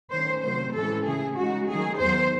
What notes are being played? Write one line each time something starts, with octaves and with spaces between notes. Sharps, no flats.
D#3 A3 C#4 C5
C3 D#3 F#3 A3 C5
A2 E3 G#3 C#4 A4
C#3 E3 A3 G#4
C#3 G#3 D#4 F#4
D#3 F#3 A3 G#4
E2 D#3 F#3 C5